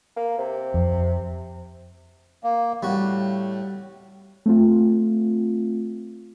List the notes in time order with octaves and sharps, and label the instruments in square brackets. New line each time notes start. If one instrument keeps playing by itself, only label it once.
[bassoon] A#3
C3
[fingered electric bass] F2
[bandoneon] A#3
[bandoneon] A2 [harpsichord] G3 F#4
[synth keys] A3 C4 F4